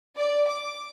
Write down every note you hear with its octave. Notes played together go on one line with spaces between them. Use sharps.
D5
D6